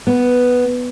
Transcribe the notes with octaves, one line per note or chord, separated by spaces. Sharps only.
B3